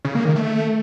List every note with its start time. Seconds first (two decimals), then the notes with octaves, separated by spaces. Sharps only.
0.05 C#3
0.15 A#3
0.25 D#3
0.36 A3